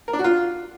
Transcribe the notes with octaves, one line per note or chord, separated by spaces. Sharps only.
A#4
D4
F#4
F4